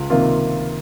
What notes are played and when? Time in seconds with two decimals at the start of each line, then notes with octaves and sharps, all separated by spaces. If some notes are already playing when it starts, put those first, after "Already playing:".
Already playing: C#2
0.10 C3 D#3 A#3 F4